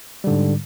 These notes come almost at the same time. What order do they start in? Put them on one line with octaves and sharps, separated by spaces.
G3 D3 G#2